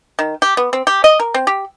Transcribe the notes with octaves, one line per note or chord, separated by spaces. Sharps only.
D#3
G4
B3
C4
G4
D#5
A#4
C4
G4